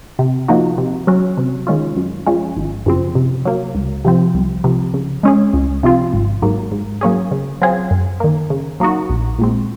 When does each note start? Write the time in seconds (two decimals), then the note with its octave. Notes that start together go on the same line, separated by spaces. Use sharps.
0.19 C3
0.48 F3 A#3 D#4 F#4
0.78 C3
1.07 F#3 C#4 F#4
1.38 C3
1.67 D#3 G#3 C#4 F4
1.97 F#2
2.27 F3 G#3 C#4
2.57 G#1
2.86 F#2 C#3 F3 C4
3.15 C3
3.45 F#3 A#3
3.75 C#2
4.05 C3 F3 C4
4.34 C2
4.64 C3 F3
4.94 C#3
5.23 G#3 C#4 G#4
5.53 C#2
5.83 C3 F3 C4 F4
6.13 G#1
6.42 G#2 F#3 A#3
6.72 G#2
7.01 F#3 A#3 C#4 G#4
7.31 C#3
7.62 F#3 C4 F4 G#4
7.91 F#2
8.20 D#3 A#3
8.50 C#3
8.80 F#3 A#3 D#4 F#4
9.10 A#1
9.39 A#2 G#3 C4